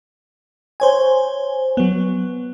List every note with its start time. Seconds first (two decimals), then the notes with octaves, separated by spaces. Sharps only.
0.80 C5 C#5 G#5
1.77 F#3 B3